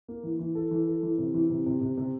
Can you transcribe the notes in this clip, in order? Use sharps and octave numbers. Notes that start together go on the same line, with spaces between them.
A#3
E3
E3
A4
E3
A4
E3
C3
E3
C3
C3
C3
C3